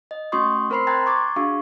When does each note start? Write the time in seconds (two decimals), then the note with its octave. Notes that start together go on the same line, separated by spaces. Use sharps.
0.11 D#5
0.32 A3 C#4 F#4 C6 C#6 D#6
0.70 C4 A#4 C5 B5 C6 C7
0.87 G5 A#5 C6 F#6 G#6 A6
1.06 C#6 D6 G#6 A6
1.36 D4 F#4 G#4 F5 C#6